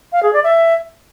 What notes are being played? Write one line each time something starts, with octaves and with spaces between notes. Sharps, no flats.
F5
G#4
D5
E5